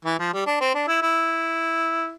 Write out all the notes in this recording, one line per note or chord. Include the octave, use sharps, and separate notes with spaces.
E3
F3
G3
D4
C4
D4
E4
E4